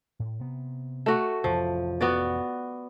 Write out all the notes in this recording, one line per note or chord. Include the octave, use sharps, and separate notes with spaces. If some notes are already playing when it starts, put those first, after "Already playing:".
A2
C3 B3
A3 F#4
A1 F2 C3 F3
B3 F#4 D5